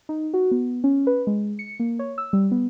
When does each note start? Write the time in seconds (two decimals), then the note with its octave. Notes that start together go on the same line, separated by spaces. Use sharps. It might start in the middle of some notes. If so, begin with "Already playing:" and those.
0.09 D#4
0.34 F#4
0.51 B3
0.84 C#4
1.07 B4
1.27 G#3
1.59 C#7
1.80 A#3
1.99 C#5
2.18 E6
2.33 G3
2.51 B3